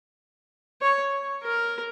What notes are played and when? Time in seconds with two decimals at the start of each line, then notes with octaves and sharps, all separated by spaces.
0.82 C#5
1.43 A#4